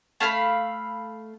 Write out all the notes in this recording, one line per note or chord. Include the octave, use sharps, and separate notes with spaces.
A3 F5 A5 B5